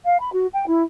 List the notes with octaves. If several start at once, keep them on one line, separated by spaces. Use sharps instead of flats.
F5
B5
F#4
G5
E4